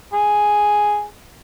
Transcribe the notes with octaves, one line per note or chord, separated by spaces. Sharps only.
G#4